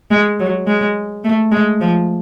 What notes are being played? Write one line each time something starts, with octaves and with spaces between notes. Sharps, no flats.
G#3
F#3
G#3
A3
G#3
F3